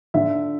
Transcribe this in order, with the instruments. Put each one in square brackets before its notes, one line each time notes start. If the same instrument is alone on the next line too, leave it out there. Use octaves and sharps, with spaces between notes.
[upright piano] D3 E5